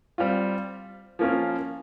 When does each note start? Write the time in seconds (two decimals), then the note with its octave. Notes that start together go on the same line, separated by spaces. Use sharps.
0.18 G3 C4 F4
1.19 F3 A#3 C#4 F4